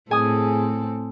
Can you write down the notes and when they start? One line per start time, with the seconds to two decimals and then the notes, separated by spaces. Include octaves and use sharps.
0.11 A2 C4 G#4 A4 G#5 D#6